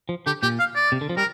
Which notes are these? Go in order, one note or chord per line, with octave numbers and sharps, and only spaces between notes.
F3
D3 G4
A#2 G4
F5
D5
C3
D3
F3
G3 A#4